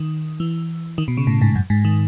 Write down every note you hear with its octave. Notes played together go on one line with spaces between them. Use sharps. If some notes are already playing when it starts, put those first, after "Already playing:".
Already playing: D#3
E3
D#3
B2
C#3
A2
G#2
F#2
G#2
D#3